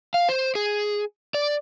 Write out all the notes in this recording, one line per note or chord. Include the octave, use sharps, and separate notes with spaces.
F5
C5
G#4
D5